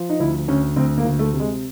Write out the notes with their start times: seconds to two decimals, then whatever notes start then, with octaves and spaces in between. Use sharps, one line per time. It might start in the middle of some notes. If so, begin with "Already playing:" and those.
Already playing: F3
0.09 D#4
0.20 D2 E4
0.48 D2 C#4
0.76 D2 C4
0.98 A#3
1.05 D2
1.19 A3
1.33 C3
1.40 G#3